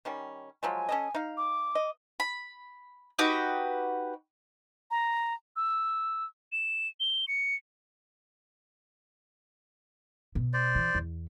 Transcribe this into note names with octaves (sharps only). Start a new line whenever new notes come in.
D#3 G3 C#4
F3 F#3 G#3 G#5
C#4 A4 D#5
D#4 F5
D6
D#5
B5
D#4 F#4 G4 B4
A#5
E6
E7
G7
C#7
B2
C5 D5
E3
E2